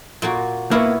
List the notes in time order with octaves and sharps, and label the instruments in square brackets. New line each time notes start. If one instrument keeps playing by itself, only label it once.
[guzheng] A#2 A#3 F#4
[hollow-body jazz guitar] A#3 B3 [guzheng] E4 C#5